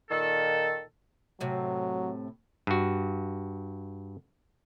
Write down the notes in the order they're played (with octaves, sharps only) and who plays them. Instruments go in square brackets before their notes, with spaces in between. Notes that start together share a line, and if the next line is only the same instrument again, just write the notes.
[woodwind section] A#2 D#3 A4
[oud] A2 C3 [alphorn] F#3
[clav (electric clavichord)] G2 F#4